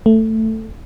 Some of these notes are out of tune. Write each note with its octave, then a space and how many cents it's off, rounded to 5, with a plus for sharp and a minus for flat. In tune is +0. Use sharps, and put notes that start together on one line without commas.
A3 +10